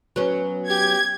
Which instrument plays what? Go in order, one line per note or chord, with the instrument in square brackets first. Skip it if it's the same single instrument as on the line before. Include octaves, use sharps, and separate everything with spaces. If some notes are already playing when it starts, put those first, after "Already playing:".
[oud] F#3 B3 C#4
[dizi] G4 [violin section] G#6